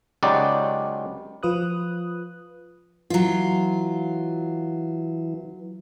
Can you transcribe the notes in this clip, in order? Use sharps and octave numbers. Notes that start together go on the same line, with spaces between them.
C#2 F#3 D#4 F#4 G4 D5
F3 F4 B4 D#6 F#6
E3 F#3 F4